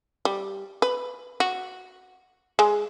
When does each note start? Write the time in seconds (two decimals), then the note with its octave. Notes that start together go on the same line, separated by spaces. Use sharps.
0.25 G3
0.82 B4
1.40 F#4
2.59 G#3